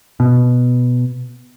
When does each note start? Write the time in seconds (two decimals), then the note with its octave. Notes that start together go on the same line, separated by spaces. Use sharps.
0.20 B2